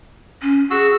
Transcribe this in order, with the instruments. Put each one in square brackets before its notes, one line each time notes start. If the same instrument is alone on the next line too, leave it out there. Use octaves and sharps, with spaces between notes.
[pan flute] C#4
[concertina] F#4 E6 [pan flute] G#4